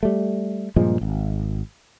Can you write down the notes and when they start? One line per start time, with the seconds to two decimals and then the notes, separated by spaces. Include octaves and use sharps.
0.03 G3 A3
0.76 G2 A#2 F3 G#3
1.01 G#1